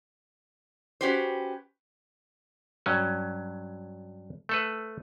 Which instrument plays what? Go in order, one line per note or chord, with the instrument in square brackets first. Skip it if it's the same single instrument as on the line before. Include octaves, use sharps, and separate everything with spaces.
[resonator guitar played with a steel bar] C#4 F#4 G4 B4 C5
[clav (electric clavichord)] G2 F#3 C#4
A3 A4 B4